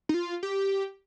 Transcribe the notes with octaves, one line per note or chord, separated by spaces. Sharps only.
D#4
F4
G4